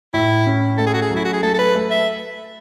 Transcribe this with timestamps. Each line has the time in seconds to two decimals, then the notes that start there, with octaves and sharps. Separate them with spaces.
0.14 A2 E4
0.46 C#4
0.78 A3 A4
0.87 G#4
0.94 F#4
1.02 G#4
1.10 F#3
1.16 E4
1.25 F#4
1.33 G#4
1.43 A3 A4
1.54 A4
1.59 B4
1.75 A3
1.91 E5